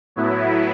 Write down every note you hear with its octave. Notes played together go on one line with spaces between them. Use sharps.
A2 F#3 B3 E4